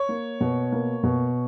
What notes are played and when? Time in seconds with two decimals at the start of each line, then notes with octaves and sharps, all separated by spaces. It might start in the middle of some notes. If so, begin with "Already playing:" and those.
Already playing: C#5
0.09 A#3
0.41 B2
0.72 A#3
1.03 B2